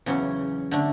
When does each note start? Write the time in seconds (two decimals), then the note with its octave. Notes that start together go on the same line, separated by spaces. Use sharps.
0.06 E2 C#3 F#3 C#4
0.71 D3 A3 D4